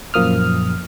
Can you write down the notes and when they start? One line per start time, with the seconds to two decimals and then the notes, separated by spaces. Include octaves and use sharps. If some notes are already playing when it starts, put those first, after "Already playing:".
0.14 F#2 A#2 F3 A#3 D#6 F6